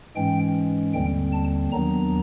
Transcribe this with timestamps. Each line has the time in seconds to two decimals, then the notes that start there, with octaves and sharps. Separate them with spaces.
0.16 G#2 E3 G#3 C#4 G5
0.94 D#2 D3 G3 C4 G5
1.33 A5
1.72 D#2 D#3 F#3 B3 D4 A#5